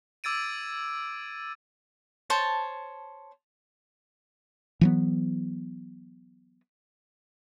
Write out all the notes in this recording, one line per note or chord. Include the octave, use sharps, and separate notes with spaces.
D6 E6 G#6 A6 D7 D#7
C5 C#5 A5
E3 F#3 B3